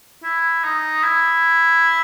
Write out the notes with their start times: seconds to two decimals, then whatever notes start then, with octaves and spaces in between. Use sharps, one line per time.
0.23 E4
0.64 D#4
1.03 E4